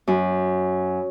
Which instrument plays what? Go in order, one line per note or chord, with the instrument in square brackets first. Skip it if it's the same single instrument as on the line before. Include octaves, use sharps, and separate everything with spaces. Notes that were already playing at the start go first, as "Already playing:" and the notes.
[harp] F#2